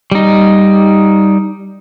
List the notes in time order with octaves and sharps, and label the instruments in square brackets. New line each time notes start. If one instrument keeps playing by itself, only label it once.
[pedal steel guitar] G3 D#4